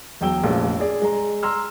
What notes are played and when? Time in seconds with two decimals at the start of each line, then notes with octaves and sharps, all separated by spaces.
0.21 E1 E2 F#3 G5 E6 G7
0.43 F1 A#1 A#2 C#4 A4
0.80 G#4 D5
1.02 G#3 A#5
1.43 A#5 C6 E6 F6